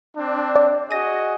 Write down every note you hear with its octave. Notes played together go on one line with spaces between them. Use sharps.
C4 D4
D5
F#4 G#4 D#5 A#6 D#7